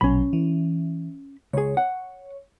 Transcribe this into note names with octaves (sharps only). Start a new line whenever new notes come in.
A#1 B2 F#3 C#4 B5
E3
C#2 G#4 C#5
F#5